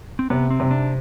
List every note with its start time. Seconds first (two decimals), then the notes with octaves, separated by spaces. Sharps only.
0.19 C4
0.30 C3 B3
0.50 C4
0.60 C3
0.71 D4